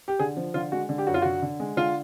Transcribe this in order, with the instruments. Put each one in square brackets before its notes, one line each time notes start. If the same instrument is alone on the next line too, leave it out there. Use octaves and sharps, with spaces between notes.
[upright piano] G4
D3 G#4
F3
D3 F4
G#3 F#4
D3
G4
F#2 F#4
F4
D3 F#4
D3
G#3
D3 F4